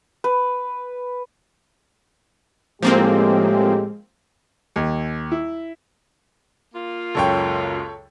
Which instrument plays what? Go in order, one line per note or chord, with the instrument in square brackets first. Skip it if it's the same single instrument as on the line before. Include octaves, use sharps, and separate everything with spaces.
[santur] B4
[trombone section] A2 G4 [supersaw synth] F3 A#3 C4 [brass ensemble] G#3
[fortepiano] D#2
E4
[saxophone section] A#3 F4
[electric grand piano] C#2 F#2 [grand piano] A4 C#5 G5